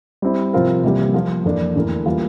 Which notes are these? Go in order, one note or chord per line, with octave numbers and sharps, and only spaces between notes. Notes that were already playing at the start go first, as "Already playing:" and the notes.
G3 C4 E4
C3 F3 C4 F4 A#4
C3 E3 G3 A#3
F3 A#3 F4
F2 E3 A#3 D4 A4
E2 D3 A3 E4 A#4
E3 G3 A#3 F4